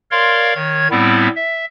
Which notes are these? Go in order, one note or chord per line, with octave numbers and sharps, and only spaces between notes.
A#4 C#5 D5 F5 C6
D#3 C#5 G#6
A2 G3 B3 C4 E4
E5